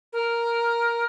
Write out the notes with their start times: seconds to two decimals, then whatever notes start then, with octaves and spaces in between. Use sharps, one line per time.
0.13 A#4